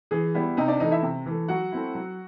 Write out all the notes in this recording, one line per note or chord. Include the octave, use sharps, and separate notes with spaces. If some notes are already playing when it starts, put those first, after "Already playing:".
E3 G#4
G3 B3 E4
C3 D#4 D#5
D4 D5
E3 A3 D#4 D#5
E4 E5
C3
E3 A3
F#3 F#4 F#5
A3 C4 E4
F#3